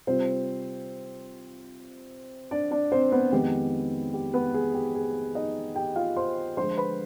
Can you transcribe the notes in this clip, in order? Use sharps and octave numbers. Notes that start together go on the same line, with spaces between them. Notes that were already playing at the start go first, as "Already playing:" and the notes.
C3 G3 C4 F4 C5
D4 D5
D4 D5
C4 C5
B3 B4
F2 D#3 G#3 B3 G4
G4
B3 B4
G#4
G4
G#4
D#4 D#5
G4 G5
F4 F5
C5 C6
D3 F3 G#3 C5 C6
B4 B5